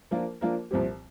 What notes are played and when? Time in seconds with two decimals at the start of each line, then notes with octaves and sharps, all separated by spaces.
0.11 F3 A#3 D4 F4 A#4
0.41 F3 A#3 D4 F4 A#4
0.71 C2 A#2 F3 C4 G4